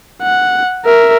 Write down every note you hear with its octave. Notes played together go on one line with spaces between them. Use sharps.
F#5
A#4 E5